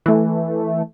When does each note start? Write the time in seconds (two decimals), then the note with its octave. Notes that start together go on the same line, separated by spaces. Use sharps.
0.06 E3 A3